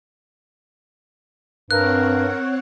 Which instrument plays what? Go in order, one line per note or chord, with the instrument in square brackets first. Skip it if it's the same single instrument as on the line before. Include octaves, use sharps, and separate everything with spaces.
[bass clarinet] G2 [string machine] C4 C#5 F#5 [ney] A#4 [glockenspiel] F#6